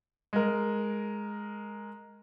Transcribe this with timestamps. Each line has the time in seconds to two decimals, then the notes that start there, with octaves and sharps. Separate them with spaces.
0.33 G#3 A#4